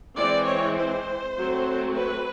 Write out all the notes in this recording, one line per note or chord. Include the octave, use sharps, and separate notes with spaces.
E3 G#3 C4 D5
C#5
C5
F#3 A3 C4
B4